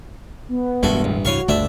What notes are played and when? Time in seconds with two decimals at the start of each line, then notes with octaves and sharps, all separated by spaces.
0.49 B3
0.83 E1 D2 G2 G#3 A3 F#4
1.04 A1
1.25 C2 E3 F#4 C#5 F5 C#6
1.48 G1 D2 A3 D4 E5